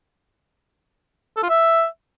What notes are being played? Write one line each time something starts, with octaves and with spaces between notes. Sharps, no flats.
A4
F4
E5